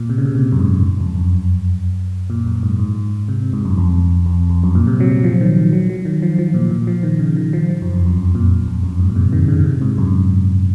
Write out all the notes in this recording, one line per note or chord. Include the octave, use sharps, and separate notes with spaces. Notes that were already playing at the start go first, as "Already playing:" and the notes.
Already playing: A#2
C3
C#3
C3
A#2
F#2
G#2
F#2
F2
F#2
A#2
F#2
G#2
G#2
C3
G#2
F#2
F2
F2
F2
F#2
A#2
C3
F#3
F#3
F3
D#3
F#3
F#3
D#3
F3
F3
A#2
A#2
F3
D#3
C#3
D#3
F3
F3
F#2
F2
F#2
F2
A#2
F#2
F2
F#2
G#2
A#2
C3
D#3
C#3
C#3
C3
G#2
F#2